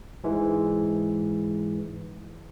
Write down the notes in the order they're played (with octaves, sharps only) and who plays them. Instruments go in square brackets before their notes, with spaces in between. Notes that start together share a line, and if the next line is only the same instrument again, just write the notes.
[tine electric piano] G#2 E3 G#3